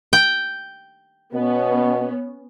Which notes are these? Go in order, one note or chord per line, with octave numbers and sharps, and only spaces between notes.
G5
B2 B3 C#4